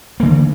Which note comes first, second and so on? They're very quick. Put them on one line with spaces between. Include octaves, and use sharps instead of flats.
A#3 D3 E3